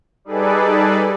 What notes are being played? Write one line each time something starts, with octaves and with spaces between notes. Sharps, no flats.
G3 D#4 G#4 A4 B4 D5